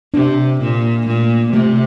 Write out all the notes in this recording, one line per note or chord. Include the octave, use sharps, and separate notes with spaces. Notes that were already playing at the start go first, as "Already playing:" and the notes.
C3 D4
A#2 D4
A#2 A3
C3 A3